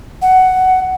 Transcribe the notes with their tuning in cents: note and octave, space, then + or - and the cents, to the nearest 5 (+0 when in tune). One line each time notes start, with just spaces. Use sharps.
F#5 +10